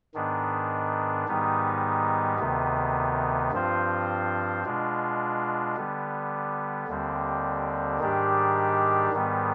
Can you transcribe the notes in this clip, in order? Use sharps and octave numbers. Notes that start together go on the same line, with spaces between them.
G#2 D#3 B3 D4
G#2 D#3 G3 B3 D#4
D2 C3 D#3 B3
G2 F3 C4 F4 C5
B2 G#3 D4 F4
D3 G3 B3
D#2 D3 G3 C4
G#2 D#3 G3 D4 G4
G#2 D#3 G3 B3